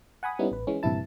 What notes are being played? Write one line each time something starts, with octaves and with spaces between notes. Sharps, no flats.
F#5 G#5 B5 D#6
G3 B3 C#4 D#4 E4
A1 B4
E3 G#3 C#4
A#1 G2 C3 E3 E4 A5